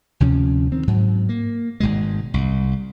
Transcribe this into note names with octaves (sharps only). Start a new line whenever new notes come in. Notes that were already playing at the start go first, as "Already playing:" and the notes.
D2 C3 F3 C#4
D#3 C4
G#2 F#3
A#3
G#1 G#2 B2 G#3
C2